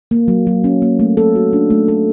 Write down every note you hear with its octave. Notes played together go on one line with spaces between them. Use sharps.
A#3
F#3
F#3
C#4
A#3
A3
A4
F#4
D4
A3
A4